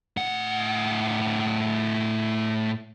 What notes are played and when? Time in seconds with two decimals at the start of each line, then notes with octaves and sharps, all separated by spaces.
0.17 A2 F#5